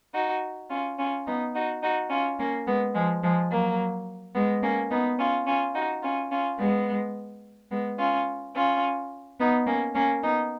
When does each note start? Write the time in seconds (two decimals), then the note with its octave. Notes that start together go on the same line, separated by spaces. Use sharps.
0.14 D#4 F#4
0.70 C#4 F4
0.98 C#4 F4
1.26 B3 D#4
1.54 D#4 F#4
1.82 D#4 F#4
2.10 C#4 F4
2.38 A#3 C#4
2.66 G#3 B3
2.94 F3 G#3
3.22 F3 G#3
3.51 F#3 A#3
4.34 G#3 B3
4.62 A#3 C#4
4.90 B3 D#4
5.18 C#4 F4
5.47 C#4 F4
5.74 D#4 F#4
6.03 C#4 F4
6.31 C#4 F4
6.59 G#3 B3
7.70 G#3 B3
7.99 C#4 F4
8.55 C#4 F4
9.39 B3 D#4
9.66 A#3 C#4
9.95 A#3 C#4
10.23 B3 D#4